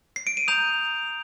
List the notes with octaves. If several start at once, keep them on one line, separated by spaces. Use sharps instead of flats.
C7
D7
D#7
A#5 D#6 G6 F7